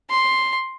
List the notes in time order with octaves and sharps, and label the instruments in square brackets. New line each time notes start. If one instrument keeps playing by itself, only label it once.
[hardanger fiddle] C6